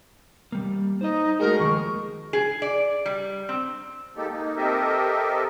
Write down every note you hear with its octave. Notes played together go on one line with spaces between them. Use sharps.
G3 A#3
D#4 C5 D#5
G#3 A3 F#4 A#4
D#2 F3 C#6
G#4
D5
G3
C4
G#3 A#3 D#4 G4 A4
A#3 D#4
C4 G4 A4 A#4 D#5 E5